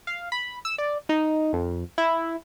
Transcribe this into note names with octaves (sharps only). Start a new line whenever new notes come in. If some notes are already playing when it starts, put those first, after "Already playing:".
F5
B5
E6
D5
D#4
F2
E4